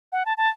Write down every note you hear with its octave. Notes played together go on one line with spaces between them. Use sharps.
F#5
A5
A5